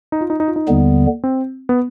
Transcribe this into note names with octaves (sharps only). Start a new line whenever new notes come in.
D#4
F4
D#4
D#4
F4
D#4
D#2 D3 G3 B3
C4
B3